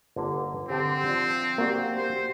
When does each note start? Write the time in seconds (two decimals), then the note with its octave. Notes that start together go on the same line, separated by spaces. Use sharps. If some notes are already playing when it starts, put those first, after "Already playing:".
0.16 G1 D3 A#3
0.69 D3 C4 G4 C5
1.05 F3 D4
1.58 A#3 D4 F#4 G4 G5
1.96 C5